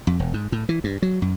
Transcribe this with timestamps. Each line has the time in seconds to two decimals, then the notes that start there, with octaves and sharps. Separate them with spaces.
0.07 F2
0.19 E1
0.34 G#2
0.52 A2
0.69 E3
0.84 G2
1.02 F#3
1.22 F#2